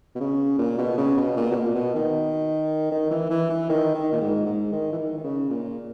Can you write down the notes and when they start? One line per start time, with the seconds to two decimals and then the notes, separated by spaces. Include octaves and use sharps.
0.15 B2
0.20 C#3
0.58 A#2
0.78 B2
0.98 C#3
1.17 B2
1.37 A#2
1.51 B2
1.56 A#2
1.75 B2
1.95 D#3
2.91 D#3
3.11 E3
3.30 E3
3.50 E3
3.69 D#3
3.95 D#3
4.12 A#2
4.20 G#2
4.46 G#2
4.72 D#3
4.93 E3
4.98 D#3
5.17 D#3
5.24 C#3
5.50 A#2